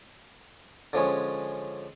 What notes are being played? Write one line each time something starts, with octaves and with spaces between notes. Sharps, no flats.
D3 F3 G#3 C#4